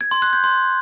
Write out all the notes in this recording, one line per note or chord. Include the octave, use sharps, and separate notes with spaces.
G#6
C6
F#6
G6
C6